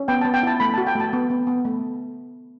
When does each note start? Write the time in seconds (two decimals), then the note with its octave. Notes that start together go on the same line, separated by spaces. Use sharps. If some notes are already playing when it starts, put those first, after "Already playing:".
Already playing: C#4
0.08 B3 G5
0.21 B3 A5
0.34 G5
0.43 E4 A5
0.60 A3 B5
0.74 F#4 A5
0.87 G5
0.95 A3 A5
1.13 B3
1.30 B3
1.47 B3
1.65 A3